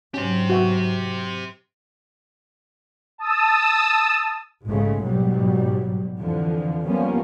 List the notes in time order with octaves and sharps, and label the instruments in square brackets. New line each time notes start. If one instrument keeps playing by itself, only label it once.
[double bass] G#2 F#3 [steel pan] C#4 [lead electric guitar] G4 C5
[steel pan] F#4 E5
[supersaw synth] A5 D#6 E6
[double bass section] A#1 G#2 C#3 G#3 A3
G#2 B2 F#3 G3
F2 D3 E3 F3
F3 G3 A#3 B3 C#4